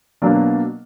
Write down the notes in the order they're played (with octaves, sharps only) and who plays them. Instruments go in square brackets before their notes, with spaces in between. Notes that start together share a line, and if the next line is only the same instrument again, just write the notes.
[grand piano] B2 F#3 A#3 D4